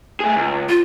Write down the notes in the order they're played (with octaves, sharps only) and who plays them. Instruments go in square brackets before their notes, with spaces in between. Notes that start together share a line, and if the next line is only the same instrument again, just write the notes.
[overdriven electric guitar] A3 G#4
C#2
[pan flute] F4